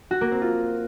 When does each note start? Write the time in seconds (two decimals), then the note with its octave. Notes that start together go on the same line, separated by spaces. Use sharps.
0.11 F#4
0.21 A#3
0.31 C4
0.42 F4